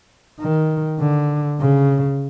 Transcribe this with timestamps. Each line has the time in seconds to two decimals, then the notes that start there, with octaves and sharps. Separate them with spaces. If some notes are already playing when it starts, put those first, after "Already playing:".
0.40 D#3
1.00 D3
1.60 C#3